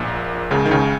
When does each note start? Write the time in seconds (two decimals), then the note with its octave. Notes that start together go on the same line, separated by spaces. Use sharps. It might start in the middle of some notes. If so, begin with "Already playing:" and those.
Already playing: A#1 A#2
0.51 C#2 C#3
0.65 D#3
0.71 C#2 C#3